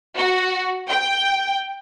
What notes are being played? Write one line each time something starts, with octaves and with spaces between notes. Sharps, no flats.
F#4
G5